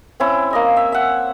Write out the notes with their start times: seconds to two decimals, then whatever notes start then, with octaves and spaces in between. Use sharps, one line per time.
0.20 C4 C#4 E4
0.51 A#3 D#5 G#5
0.76 E5
0.92 E5 F#5